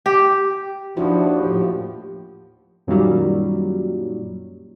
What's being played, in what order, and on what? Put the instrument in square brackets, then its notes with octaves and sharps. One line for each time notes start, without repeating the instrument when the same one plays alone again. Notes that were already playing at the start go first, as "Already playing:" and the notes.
[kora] G4
[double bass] D#2 [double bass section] F3 [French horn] D4 [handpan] E4 F#4
[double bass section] A2 F3 [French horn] G4
[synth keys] F#2 A#2 D#3 F#3 G3